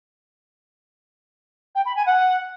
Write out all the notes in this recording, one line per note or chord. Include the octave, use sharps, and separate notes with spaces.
G5
B5
G#5
F#5